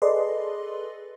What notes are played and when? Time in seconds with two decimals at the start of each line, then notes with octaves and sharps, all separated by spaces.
0.02 G#4 A4 B4 D5 D#5 C6